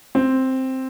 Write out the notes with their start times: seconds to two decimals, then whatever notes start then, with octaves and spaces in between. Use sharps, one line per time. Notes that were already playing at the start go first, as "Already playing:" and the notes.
0.15 C4